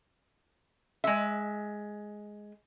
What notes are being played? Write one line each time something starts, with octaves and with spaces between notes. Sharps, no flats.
G#3 E5